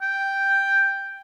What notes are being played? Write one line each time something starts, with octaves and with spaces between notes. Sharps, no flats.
G5